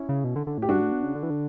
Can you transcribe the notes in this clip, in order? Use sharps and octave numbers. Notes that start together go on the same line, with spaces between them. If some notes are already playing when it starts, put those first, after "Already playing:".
Already playing: C#4 E4
C#3
B2
D3
D3
A2 G4
G2 D4 F#4
A2
B2
C#3
D3
E3
D3